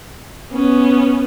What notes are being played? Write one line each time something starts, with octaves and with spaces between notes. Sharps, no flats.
B3 C#4